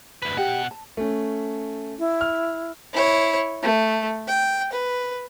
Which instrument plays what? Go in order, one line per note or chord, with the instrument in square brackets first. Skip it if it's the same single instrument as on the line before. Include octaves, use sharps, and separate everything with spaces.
[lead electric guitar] D2 B4
[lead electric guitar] B2 F#5 [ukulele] G4 D#5
[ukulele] A5
[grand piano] A3 C#4
[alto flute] E4
[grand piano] F6
[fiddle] E4 C#5
A3
G5
B4